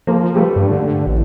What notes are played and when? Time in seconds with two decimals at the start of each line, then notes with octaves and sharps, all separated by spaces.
0.07 F3 A#3
0.35 G3 A3 B4
0.56 G2
0.71 D3
1.07 A1